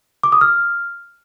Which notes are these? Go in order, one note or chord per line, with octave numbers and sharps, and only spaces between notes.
D6
D#6
F6